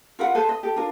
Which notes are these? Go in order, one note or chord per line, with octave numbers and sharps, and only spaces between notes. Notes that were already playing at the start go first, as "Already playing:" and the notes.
F4 A#4 B4 F#5
A4 B4 C5
D#5
G4 A4
D4 F4 A#4